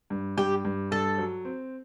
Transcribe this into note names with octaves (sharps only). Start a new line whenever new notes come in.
G2
G2 G4
G2
G2 A4
F#3
C4